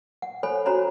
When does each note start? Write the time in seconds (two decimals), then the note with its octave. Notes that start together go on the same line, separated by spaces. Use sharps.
0.22 F#5
0.43 A4 C5 C#5 G#5 B5
0.66 C#4 F#4 C5 C#5 A#5 B5